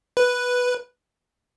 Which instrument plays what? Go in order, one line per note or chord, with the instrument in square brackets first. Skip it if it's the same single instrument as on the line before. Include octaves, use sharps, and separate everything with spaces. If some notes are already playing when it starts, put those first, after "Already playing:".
[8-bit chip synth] B4